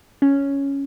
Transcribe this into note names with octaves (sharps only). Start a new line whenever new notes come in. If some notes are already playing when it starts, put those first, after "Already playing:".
C#4